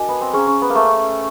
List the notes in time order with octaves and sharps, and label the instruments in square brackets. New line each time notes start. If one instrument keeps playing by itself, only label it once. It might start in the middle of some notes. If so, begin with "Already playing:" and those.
Already playing: [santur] D4 [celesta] F#4 A#4 D#5 G#5
[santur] B3
C4
[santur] C#4 [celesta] G#4 C5 F5 A#5
[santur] C#4
B3
A#3
A3